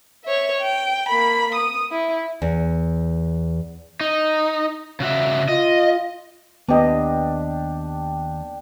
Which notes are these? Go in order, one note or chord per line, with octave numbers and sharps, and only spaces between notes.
C#5 E5
G5
A#3 B5
D#6
E4
E2
D#4
C#3 F#4 E5
F4 D#5
D#2 B3 D4 G4 D#5